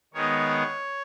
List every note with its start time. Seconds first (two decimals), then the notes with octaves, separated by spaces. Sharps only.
0.14 D#3 G#3 B3 D#4 C#5